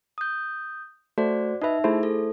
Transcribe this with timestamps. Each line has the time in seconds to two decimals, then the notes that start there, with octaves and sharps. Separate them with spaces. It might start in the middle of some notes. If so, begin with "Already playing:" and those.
0.18 D#6 G6
1.18 A3 F#4 C5 D5
1.62 D#4 B4 D#5 E5
1.84 A3 E4 G#4 C5
2.03 A4